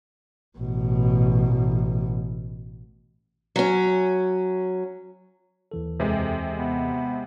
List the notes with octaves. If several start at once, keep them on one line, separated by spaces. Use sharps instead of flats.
A1 B2
F#3 C#4
D#2 E3 A4
F2 C3 G#3
B3